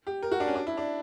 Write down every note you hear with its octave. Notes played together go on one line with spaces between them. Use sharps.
G4
A#4
F#4
D4
C#4
D4
E4
D4